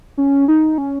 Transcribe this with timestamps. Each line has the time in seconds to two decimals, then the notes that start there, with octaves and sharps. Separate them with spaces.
0.17 C#4
0.48 D#4
0.78 C#4